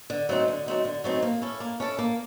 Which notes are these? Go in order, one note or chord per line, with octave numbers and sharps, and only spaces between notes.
D3
F#3 A3 C4 D#4
D3
F#3 A3 C4 D#4
D3
F#3 A3 C4 D#4
A#3
C#4 E4 A4
A#3
C#4 E4 A4
A#3